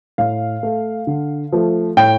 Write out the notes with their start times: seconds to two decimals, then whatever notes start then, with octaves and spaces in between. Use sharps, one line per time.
0.18 A2 F5
0.63 A3
1.07 D3
1.52 F3 A3
1.97 A2 G5